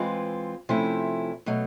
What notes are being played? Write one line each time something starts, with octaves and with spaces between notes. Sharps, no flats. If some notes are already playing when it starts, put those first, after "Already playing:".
Already playing: E3 G#3 C4 F4
C3 F3 A3 C#4 E4
B2 F#3 A3